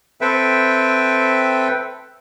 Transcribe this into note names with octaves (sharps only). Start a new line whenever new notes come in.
C4 A4 B4 E5 G5